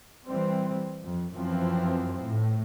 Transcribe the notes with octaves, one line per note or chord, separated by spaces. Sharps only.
E3 G3 C4
F2
F#2 E3 F3 C4
A2